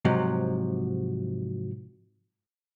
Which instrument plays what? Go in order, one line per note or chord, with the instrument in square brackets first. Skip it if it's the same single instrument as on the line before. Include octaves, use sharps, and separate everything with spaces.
[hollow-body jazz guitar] G#2 C3 F3 F#3